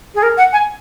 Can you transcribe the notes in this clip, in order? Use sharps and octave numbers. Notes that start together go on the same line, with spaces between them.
G#4
A#4
F#5
G#5